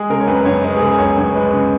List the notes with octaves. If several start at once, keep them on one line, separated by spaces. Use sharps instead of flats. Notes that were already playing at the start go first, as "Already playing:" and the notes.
Already playing: G#3 G#4
C#3 A#4
C#5
F#2 B4
F#2 C#5
G#3 B4
G#4
C#3 A#4
F#2 C#5
F#2 C#5
G#3 B4
C#3